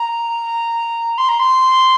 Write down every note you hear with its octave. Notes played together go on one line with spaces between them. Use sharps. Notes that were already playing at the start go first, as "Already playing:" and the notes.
Already playing: A#5
C6
A#5
C6